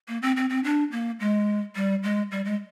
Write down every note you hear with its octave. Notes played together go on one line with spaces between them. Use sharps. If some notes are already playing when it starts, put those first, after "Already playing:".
A#3
C4
C4
C4
D4
A#3
G#3
G3
G#3
G3
G#3